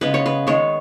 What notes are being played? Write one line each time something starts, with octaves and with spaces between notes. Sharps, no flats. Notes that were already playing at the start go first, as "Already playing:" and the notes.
C#3 G#3 B3 B4
C#5
B4
D#3 G#3 B3 C#5